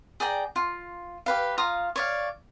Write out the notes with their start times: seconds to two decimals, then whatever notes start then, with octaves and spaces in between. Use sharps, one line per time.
0.20 G#4 D5 G5 A#5
0.56 F4
1.26 G4 B4 F5
1.58 F4 F5 A#5 D#6
1.96 C#5 D5 F5